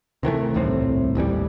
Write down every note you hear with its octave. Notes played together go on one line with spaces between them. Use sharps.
C3 D#3 E3 A3
D#1 C2 A2 C4
A1 D#2 E3 G3